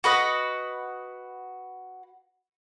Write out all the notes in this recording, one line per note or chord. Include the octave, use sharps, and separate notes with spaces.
F#4 B4 D#5 F#5